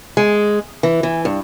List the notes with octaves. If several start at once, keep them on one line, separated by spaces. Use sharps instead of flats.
G#3
E3
E3
G2